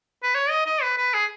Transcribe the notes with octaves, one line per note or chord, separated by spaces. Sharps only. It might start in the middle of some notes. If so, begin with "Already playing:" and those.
B4
C#5
D#5
D#5
B4
B4
G#4